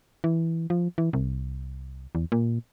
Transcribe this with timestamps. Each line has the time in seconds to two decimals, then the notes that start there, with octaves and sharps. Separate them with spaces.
0.24 E3
0.70 F3
0.98 E3
1.13 C2
2.15 E2
2.32 A#2